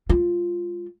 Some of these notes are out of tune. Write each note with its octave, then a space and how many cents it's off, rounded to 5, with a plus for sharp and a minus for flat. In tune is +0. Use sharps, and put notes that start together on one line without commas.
G#3 -35 F4 +0